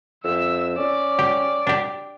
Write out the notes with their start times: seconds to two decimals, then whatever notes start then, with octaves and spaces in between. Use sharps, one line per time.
0.24 F2 E5 E6
0.78 C#4 D5
1.19 G4
1.67 D4 G4